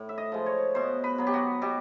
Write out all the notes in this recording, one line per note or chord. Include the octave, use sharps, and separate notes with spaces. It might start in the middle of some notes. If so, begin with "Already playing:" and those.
Already playing: A2
E5
D#5
F3 G#3
C#5
B2 C5
B4
F#3 B3
G4
F#4
B2 G4